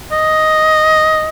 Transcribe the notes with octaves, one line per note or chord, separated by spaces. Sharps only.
D#5